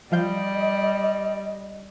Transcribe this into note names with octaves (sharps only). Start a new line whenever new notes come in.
F3 G3 D#5 F5 G6